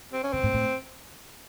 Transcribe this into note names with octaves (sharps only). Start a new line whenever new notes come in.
C4
C#4
C#3 C4
A2
A2